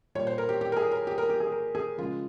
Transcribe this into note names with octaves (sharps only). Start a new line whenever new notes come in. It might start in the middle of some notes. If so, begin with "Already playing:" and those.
A#2 G3 C#5
C5
A#4
G4
G4
A#4
G#4
A#4
G4
A#4
G4
G#4
A#4
G#4
C#3 F3 G#3 F4